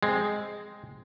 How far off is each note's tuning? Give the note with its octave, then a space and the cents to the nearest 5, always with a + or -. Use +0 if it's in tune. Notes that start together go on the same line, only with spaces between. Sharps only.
G#3 +0 C4 +0